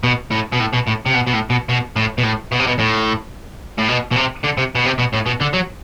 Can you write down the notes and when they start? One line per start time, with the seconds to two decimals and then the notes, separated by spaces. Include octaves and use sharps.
0.04 B2
0.31 A2
0.52 B2
0.60 A2
0.73 B2
0.87 A2
1.06 C3
1.14 B2
1.27 B2
1.33 A2
1.50 B2
1.69 B2
1.96 A2
2.18 B2
2.23 A2
2.52 B2
2.59 C3
2.67 B2
2.79 A2
3.79 A2
3.89 B2
4.11 B2
4.16 C3
4.44 D3
4.58 C3
4.75 B2
4.86 C3
4.98 B2
5.13 A2
5.26 B2
5.41 D3
5.53 F#3